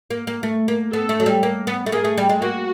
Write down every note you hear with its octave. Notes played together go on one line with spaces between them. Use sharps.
A#3
A#3
A3
A#3
B3 A4
A3
F#3
G3
A#3
B3
A3
A#3 G#4
A3
G3
G#3
A#3 F#4